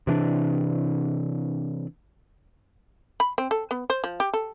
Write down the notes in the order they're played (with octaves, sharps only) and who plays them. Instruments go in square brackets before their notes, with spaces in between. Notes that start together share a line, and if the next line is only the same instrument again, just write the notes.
[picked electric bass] C3 E3 D4
[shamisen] B5
C4
A4
B3
C5
F3
G4
A4